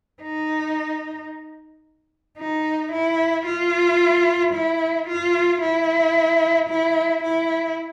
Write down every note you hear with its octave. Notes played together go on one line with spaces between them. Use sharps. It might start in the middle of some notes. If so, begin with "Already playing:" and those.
D#4
D#4
E4
F4
E4
F4
E4
E4
E4